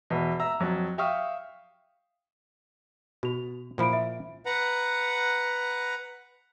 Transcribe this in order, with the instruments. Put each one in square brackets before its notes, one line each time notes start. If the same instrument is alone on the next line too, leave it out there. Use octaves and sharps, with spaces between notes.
[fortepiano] E2 B2
E5 A#5 E6
F2 F#3
E5 F5 G5 C#6 D#6 F6
[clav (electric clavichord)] B2 [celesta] F#4 F7
[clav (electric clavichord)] A#2 F3 E4 [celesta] C5 B5 D7
[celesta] E5
[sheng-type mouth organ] B4 F#5 A#5